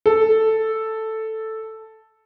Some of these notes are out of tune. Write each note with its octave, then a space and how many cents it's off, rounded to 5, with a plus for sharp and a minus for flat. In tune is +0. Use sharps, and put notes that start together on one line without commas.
A4 +0